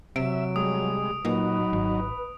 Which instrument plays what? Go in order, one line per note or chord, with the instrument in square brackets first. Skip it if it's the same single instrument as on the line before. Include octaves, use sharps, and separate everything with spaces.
[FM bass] C3 [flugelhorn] F#3 [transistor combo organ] E5 [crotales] D7
[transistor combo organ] G3 G#3 [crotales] D#6
[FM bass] A#2 [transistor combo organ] F#3 D#4 [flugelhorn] B4
[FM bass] G#1